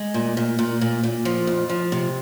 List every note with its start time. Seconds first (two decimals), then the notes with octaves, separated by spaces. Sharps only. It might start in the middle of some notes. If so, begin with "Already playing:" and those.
Already playing: G#3
0.14 A#2
0.37 A#2
0.59 A#2
0.81 A#2
1.03 A#2
1.25 F3
1.47 F2
1.70 F3
1.92 C3